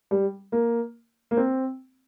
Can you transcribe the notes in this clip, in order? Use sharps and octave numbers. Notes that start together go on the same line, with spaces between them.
G3
A#3
A#3
C4